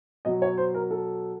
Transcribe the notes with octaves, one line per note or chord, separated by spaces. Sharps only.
B2 F#3 D#5
C#5
C5
A#4
A4